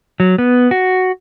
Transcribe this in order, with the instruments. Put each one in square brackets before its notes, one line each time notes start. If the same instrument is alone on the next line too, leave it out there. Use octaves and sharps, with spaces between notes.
[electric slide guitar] F#3
B3
F#4